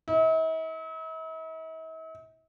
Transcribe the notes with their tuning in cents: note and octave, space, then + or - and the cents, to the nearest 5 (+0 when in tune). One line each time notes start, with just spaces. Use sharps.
E4 -45